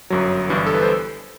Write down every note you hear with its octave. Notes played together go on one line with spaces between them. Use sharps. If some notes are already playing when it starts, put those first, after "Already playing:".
G1 F#2 F#3
G1 G2 E3
A4
B4
C5